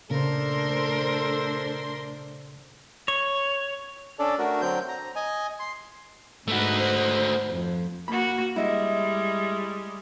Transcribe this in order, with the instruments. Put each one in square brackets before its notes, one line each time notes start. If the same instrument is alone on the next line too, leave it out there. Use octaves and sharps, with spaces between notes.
[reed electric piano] A#2 C#3 [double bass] A3 D4 [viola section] A4 C5 [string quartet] A#4 C6
[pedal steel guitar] C#5
[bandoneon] C#4 D4 A4 D5
A3 D4 F#4 A#4
D3 F#3 C4 G6
A#5
D#5 G#5
C6
[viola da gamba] G#2 D#4 B4 [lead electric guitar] A3 F#4
[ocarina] C5
[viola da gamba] F2
[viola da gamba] A#3 F#4 [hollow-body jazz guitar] B5
[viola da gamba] G3 G#3 [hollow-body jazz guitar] E4 D#5